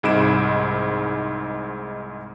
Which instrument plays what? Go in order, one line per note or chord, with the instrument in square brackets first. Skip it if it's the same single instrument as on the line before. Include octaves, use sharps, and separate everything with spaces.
[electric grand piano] C2 G#2 G#3 B5 D7 E7